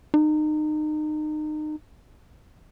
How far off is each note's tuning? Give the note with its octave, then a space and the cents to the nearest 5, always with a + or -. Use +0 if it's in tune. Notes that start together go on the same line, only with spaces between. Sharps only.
D#4 -30